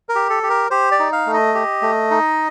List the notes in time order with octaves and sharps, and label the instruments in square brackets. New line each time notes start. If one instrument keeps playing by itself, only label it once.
[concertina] A#4
G4
A4
G4
A#4
G4 C5
D5
D#4
F5
A3
D#5
G4
A3
D#4